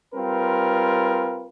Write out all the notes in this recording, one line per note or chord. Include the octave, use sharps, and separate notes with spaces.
G3 C4 F4 A#4 B4